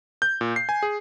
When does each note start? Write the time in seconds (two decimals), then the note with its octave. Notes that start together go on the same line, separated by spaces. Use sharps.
0.22 G6
0.41 A#2
0.56 C7
0.69 G#5
0.83 G#4